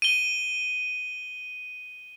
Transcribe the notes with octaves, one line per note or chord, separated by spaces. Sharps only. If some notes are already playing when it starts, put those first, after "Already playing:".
D#7 G7